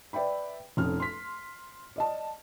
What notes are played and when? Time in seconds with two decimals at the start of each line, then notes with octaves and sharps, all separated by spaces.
0.13 B4 D5 E5 G5 B5
0.77 F1 F2 C#4 F6
1.00 C6 B6
1.96 D5 D#5 A5